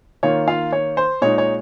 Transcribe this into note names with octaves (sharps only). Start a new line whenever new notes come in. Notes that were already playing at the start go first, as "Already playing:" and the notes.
D#3 A#3 F4 C#5
F4 F5
C#5
C5
A#2 G#3 D#4 C#5
C#5